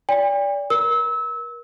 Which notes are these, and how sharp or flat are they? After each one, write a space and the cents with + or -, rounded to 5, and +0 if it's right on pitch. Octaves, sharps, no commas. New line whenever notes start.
D5 -25 G5 +45
A#4 +35 E6 -25